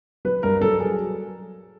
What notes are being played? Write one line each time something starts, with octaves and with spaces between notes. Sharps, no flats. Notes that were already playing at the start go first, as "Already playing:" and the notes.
F#3 B4
G2 A#4
F#3 A4
G#4